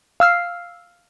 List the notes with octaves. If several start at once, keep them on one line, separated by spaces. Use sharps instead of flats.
F5 E6 F6 C7